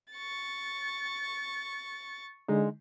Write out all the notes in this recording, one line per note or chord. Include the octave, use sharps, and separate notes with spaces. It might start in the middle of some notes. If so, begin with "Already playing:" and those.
C#6 A6
D3 G#3 D#4